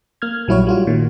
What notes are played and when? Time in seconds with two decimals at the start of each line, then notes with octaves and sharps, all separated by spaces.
0.22 A#3 F6 G#6
0.48 A#1 F#3 G3 E4 F#4 C#5
0.67 G3 F4 F#4
0.87 A#2 D#3